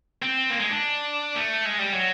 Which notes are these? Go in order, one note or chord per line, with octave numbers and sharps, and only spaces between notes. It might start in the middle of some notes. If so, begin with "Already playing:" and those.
C4
A#3
G#3
D4
A3
G#3
G3
F#3